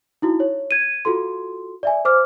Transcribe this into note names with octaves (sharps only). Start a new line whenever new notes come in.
D#4 E4 F#4
C#5
G#6 D#7
F4 F#4 A4 C6
D5 E5 G#5
C5 D6 F6